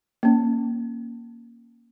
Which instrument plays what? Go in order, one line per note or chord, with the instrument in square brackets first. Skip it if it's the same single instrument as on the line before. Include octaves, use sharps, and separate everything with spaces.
[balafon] A#3 C#4